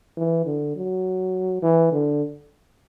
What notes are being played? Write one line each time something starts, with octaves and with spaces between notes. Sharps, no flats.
E3
D3
F#3
E3
D3